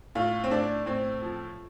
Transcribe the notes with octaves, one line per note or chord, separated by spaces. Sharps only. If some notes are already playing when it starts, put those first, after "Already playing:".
A2 F4
C4
A2 D4
A2 C4
F3